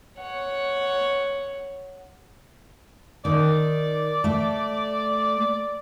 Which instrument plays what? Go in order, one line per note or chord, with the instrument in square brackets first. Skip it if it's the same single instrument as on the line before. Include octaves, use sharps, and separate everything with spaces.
[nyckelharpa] C#5 F#5
[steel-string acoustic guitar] D#3 [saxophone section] D5
[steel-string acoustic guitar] A3